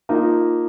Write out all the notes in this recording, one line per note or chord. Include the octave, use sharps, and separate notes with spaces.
F3 A#3 D#4